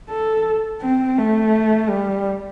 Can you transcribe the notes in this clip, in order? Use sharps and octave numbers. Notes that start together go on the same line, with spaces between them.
A4
C4
A3
G3